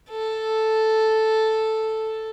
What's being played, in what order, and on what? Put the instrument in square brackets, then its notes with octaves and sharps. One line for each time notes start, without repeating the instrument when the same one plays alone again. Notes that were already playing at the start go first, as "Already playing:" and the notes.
[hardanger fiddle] A4